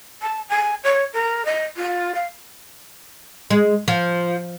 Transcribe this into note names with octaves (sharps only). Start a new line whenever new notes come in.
A5
G#5
C#5
A#4
D#5
F4
F5
G#3
F3